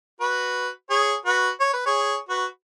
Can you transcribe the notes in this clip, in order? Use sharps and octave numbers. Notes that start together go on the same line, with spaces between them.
F#4 B4
G#4 C#5
F#4 B4
C#5
B4
G#4 C#5
F#4 B4